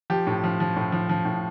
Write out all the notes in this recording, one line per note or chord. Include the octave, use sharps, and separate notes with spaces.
F3 G4
A2
F3
F3
A2
F3
F3
A2